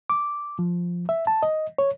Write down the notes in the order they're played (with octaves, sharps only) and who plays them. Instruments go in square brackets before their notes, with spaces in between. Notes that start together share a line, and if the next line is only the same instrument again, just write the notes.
[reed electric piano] D6
F3
E5
A5
D#5
C#5